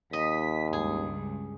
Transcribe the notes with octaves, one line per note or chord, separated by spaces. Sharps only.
D#2 D#5 B6
C#2 G2 G#4